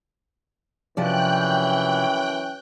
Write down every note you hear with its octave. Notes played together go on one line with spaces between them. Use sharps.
F#2 C3 E3 F3 C#4 D5 G5 F#6